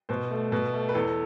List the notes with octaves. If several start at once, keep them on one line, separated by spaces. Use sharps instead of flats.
B2 C5
A3
B2
A3
B4
E2 A4